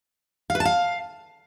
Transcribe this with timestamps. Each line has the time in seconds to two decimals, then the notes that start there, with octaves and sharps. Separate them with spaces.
0.50 F5
0.55 B4
0.60 A5
0.65 F5